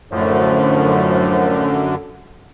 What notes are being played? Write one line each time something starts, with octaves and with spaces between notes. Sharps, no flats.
F#2 A2 D3 F3 A3